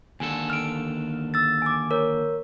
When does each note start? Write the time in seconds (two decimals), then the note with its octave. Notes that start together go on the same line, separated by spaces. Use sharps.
0.20 D#2 D3 A4 G#5
0.50 F6 D7
1.34 E6 A6
1.62 G#5 D6
1.91 A#4 C#5